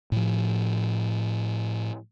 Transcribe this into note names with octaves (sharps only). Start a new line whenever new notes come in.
A2 F3